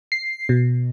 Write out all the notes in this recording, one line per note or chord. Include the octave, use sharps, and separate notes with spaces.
C7
B2